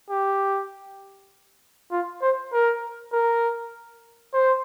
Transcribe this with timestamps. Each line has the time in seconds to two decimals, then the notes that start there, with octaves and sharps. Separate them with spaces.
0.10 G4
1.91 F4
2.22 C5
2.53 A#4
3.13 A#4
4.34 C5